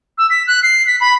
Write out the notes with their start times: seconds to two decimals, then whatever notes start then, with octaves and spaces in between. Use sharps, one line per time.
0.18 E6
0.30 B6
0.47 F#6
0.63 C7
0.87 B6
1.01 B5